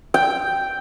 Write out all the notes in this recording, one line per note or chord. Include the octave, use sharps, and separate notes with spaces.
G5